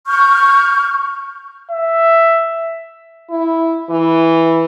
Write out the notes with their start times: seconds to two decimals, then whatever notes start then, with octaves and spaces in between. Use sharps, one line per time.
0.07 C#6 F6 G6
1.71 E5
3.30 E4
3.90 E3